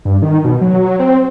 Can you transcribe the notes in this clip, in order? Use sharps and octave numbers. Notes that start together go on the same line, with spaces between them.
G2
D#3
B2
F#3
C4